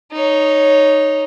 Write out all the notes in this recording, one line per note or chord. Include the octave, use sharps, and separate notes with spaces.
D#4 C#5